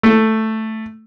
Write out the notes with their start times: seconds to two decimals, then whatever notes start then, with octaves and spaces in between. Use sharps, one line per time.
0.03 A3